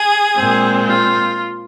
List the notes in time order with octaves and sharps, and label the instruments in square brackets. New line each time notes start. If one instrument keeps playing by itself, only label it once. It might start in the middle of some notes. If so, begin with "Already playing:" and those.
Already playing: [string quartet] G#4
A#2 G#3 C4
F4